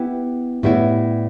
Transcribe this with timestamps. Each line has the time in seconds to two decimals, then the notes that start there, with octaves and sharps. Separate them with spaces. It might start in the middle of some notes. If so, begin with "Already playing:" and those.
Already playing: B3 E4 G4
0.63 A2 G3 B3 E4